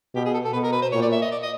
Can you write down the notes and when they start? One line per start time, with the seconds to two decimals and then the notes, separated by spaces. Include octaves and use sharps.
0.15 B2 G4
0.25 G#4
0.34 A4
0.45 A4
0.53 B2 B4
0.63 A#4
0.72 B4
0.82 C5
0.92 A#2 C#5
1.02 D5
1.12 E5
1.22 D#5
1.31 D5
1.42 D#5